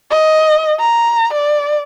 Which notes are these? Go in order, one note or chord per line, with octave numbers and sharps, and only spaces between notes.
D#5
A#5
D5